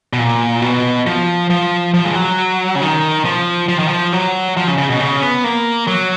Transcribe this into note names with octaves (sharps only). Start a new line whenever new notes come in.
B2
A#2
B2
F3
F3
F3
G#3
F#3
C#3
D#3
F3
F3
D#3
F3
F#3
F3
C#3
C#3
B2
C#3
C#4
B3
A#3
F#3